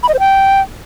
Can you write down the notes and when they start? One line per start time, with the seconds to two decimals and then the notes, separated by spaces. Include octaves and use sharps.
0.03 B5
0.09 D#5
0.14 C5
0.20 G5